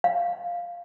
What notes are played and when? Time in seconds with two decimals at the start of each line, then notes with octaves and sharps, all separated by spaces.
0.04 F5